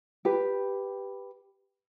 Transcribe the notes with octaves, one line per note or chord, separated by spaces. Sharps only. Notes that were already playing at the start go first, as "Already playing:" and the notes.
G4 B4